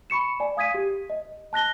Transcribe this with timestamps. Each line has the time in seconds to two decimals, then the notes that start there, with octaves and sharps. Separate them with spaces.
0.10 B5 C#6 C#7 E7
0.40 D5 G#5
0.57 F5 D#6 G#6 B6 D#7
0.74 G4
1.10 D#5
1.53 A5 F#6 A#6 G7